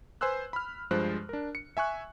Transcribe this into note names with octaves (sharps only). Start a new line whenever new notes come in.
B4 C5 G#5 C6 E6 F#6
B5 F6
G2 F3 G#3 C5 F#6
D4 A#4
C#7
E5 G#5 C#6 F#6